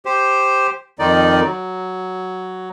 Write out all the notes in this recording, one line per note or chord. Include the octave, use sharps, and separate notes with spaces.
G4 C5
F2 D#3 D#4 D5
F#3